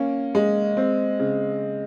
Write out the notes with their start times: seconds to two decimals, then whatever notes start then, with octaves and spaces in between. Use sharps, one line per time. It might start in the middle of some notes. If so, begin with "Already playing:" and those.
Already playing: A#3 C#4
0.35 G#3
0.77 C4
1.19 C#3